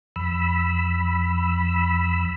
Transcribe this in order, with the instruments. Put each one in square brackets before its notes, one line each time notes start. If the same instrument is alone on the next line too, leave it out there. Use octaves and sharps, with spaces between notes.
[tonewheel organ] F2 B5 E6